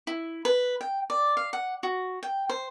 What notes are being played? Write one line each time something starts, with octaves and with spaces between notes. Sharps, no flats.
E4
B4
G5
D5
F5
F#5
F#4
G5
C5